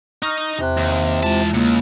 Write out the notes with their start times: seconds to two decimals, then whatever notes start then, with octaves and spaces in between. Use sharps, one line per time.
0.23 D#4 D#5 C#6 F6
0.59 E2 C3 F#6
0.77 D#2
1.23 E3 G#3 E4 F4 A5
1.54 C#2 C3 A#3